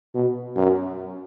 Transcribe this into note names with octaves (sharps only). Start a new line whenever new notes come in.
B2
F#2